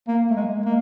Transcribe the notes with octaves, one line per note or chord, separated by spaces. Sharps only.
A#3
A3
G#3
A#3